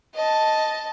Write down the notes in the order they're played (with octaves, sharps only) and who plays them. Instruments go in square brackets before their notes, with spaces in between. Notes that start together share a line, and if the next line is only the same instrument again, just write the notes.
[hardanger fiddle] D#5 A5